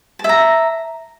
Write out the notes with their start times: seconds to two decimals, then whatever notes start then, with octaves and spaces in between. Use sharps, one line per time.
0.19 A5
0.24 E5
0.29 A#5